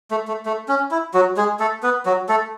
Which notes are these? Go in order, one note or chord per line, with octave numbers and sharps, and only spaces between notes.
A3
A3
A3
C#4
E4
F#3 F#4
G#3 G#4
A3 A4
B3 B4
F#3 F#4
A3 A4